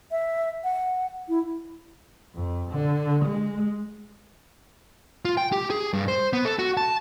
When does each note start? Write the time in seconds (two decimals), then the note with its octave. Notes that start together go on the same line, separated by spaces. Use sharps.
0.11 E5
0.64 F#5
1.29 E4
2.35 F2
2.70 D3
3.25 G#3
5.25 F4
5.37 G5
5.52 G4
5.70 G#4
5.93 G2
6.08 C5
6.33 B3
6.45 A4
6.59 F#4
6.77 A5